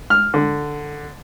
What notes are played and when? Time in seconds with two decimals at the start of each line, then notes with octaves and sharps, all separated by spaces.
0.10 F6
0.34 D3